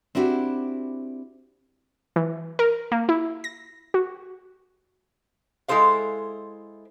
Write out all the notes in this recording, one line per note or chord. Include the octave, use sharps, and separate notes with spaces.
C4 D4 E4 F#4 G4
E3
A#4
A#3
E4
A#6
F#4
G#3 E4 A4 C5 F5